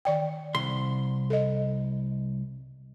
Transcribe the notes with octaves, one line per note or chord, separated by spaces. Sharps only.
D#3 D5 G5
C2 C6
A4 D#5